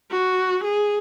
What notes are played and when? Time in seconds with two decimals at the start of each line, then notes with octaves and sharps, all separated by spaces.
0.11 F#4
0.64 G#4